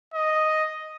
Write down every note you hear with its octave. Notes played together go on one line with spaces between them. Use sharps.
D#5